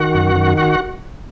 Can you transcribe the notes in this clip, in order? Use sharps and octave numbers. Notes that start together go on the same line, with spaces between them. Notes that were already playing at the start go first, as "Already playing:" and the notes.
Already playing: D#3 F#4 F#5
F#2
D#3
F#4 F#5